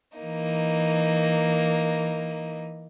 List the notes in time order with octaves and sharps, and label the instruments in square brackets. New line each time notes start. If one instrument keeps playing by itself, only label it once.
[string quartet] E3 A#3 D#4